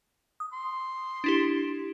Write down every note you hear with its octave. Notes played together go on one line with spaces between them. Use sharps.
D#6
C6
D4 E4 G4